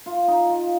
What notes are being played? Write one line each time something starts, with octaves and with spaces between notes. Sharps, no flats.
F4
D#4
F4